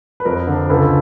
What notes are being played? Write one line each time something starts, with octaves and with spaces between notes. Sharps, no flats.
B4
F2 A#4
D3
C#2 A4 B4